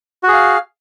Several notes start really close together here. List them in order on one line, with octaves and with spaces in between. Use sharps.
F#4 G#4 F5